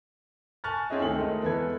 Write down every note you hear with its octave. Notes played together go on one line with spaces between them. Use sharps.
G#5 A5 C#6 F6 F#6 A6
C4 C#4 E4 G#4 C#5 D#5
D2 D#3 A4 F#7
G#3 A3 A#4 D#5
E2 E3 A4 B4 G#6